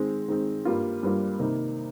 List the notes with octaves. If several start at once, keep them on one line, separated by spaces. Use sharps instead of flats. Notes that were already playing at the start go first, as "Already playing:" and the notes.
Already playing: D#3 G#3 C4
D#3 G#3 C4
G2 G3 A#3 F4
G2 G3 A#3 F4
C3 D#3 A#3 D#4